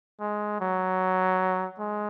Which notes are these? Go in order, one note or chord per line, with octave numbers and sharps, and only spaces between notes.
G#3
F#3
G#3